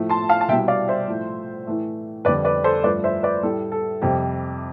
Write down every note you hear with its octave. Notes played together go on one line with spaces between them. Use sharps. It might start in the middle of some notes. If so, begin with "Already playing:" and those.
Already playing: A2 F3 A3
A5 C6
F5 A5
A5
C2 B2 G3 E5 G5
D5 F5
C5 E5
A2 F3 A3
A2 E3 A3
F2 D3 G3 B4 D5
B4 D5
A4 C5
G2 F3 A3 B4 D5
C5 E5
B4 D5
A2 G3 A4
A4
F2 C3 G3 G4